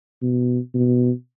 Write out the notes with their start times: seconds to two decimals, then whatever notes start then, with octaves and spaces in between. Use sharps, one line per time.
0.22 B2
0.74 B2